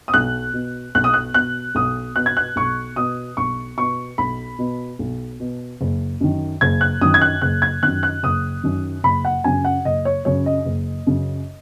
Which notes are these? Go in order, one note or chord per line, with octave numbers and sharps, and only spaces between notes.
D#6
B1 F#6
B2
B1 F#6
D#6
F#6
B2 F#6
B1 D#6
B2 F#6
G#6
F#6
B1 C#6
B2 D#6
B1 C#6
B2 C#6
B1 B5
B2
B1
B2
F#1
F#2 D#3
F#1 G#6
F#6
F#2 D#3 D#6
G#6
F#6
F#1 F#6
G#6
F#2 D#3 F#6
F#6
F#1 D#6
F#2 D#3
F#1 B5
F#5
F#2 C#3 G#5
F#5
F#1 D#5
C#5
F#2 C#3 C#5
D#5
F#1
F#2 C#3